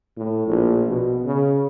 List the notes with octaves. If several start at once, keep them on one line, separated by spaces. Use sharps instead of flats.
A2
A#1
B2
C#3